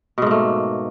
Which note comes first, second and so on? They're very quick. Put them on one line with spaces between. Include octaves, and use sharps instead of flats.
B2 G#2 A#3 A3